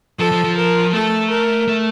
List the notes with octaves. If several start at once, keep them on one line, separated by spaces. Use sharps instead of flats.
F3 A4
F3
F3
A#4
A3 A4
A#4
A3